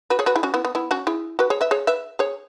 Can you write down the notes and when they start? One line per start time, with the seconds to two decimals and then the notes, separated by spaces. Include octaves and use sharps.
0.10 F#4 B4
0.19 G#4 C#5
0.26 F#4 B4
0.36 E4 G#4
0.43 C#4 F#4
0.54 B3 E4
0.65 B3
0.75 B3 E4
0.91 C#4 F#4
1.07 E4 G#4
1.39 F#4 B4
1.50 G#4 C#5
1.61 B4 E5
1.71 G#4 C#5
1.87 B4 E5
2.19 G#4 C#5